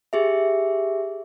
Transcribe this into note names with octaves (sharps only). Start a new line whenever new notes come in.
G4 G#4 E5